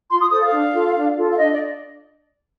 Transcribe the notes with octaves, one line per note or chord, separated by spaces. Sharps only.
F4 C6
D#6
A4 C5 D#6
F5
D4
F4 A4
D4
F4 A4
F5
D4 D#5
D5